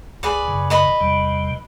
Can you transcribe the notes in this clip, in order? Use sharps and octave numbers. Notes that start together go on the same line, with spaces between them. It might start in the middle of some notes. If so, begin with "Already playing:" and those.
C2 G#4 B4 D5
F#2 C#3
B4 D#5 B5
E2 C3 G3